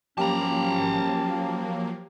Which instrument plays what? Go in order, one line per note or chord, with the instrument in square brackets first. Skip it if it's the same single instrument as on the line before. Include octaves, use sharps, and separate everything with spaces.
[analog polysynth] F3 F#3 A#3 [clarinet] C#4 [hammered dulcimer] G4 [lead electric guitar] A5 A#5